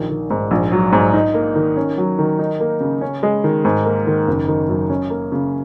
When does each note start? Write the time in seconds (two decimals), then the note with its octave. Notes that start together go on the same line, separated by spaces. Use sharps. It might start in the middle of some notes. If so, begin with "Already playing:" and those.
Already playing: A#1 D#3
0.10 D#3
0.30 G#2
0.51 A#1
0.72 F#3
0.92 G#2
1.14 D#4
1.34 A#3
1.56 D#3
1.77 C#4
1.98 F#3
2.19 D#3
2.39 D#4
2.60 A#3
2.80 C#3
3.01 C#4
3.23 G#3
3.44 D#3
3.65 G#2
3.86 A#3
4.07 D#3
4.28 F#1
4.48 D#3
4.69 F#2
4.90 C#4
5.10 A#3
5.32 C#3